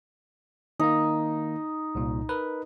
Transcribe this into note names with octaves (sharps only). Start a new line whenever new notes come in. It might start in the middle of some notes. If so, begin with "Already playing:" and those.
D#3 A#3 D#4
C2 A#2
A#4 B4